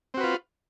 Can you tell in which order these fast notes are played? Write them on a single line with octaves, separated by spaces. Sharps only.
C4 F#4 B4 F4